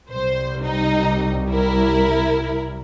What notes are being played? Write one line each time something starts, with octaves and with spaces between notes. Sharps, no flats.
C2 G3 C5
D#4
E4 A#4